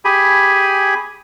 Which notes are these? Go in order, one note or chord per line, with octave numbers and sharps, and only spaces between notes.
G4 G#4 G#5 B5